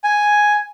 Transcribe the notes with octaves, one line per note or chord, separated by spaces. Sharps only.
G#5